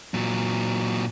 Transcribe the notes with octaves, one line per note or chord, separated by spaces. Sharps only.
A#2 F#3